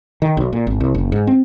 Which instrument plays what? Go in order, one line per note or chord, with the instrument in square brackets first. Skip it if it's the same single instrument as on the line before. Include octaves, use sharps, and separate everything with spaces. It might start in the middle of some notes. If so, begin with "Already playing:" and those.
[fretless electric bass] D#3
B1
A#2
G#1
C2
F#1
G#2
C4